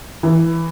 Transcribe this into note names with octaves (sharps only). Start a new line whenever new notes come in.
E3